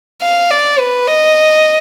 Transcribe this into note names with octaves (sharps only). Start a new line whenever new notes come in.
F5
D5
B4
D#5